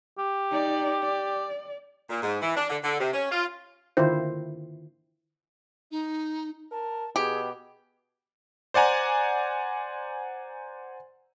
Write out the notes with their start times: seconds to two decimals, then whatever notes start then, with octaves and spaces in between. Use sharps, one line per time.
0.18 G4
0.51 D#4 D5
1.03 D5
2.10 A#2
2.22 G#2
2.42 E3
2.57 D4
2.69 D3
2.84 D3
3.00 C3
3.14 C#4
3.32 F4
3.97 D3 D#3 E4 F4 C5
5.91 D#4
6.72 A#4 A5
7.16 B2 G4 G#4
8.74 C5 D5 F#5 G#5 A#5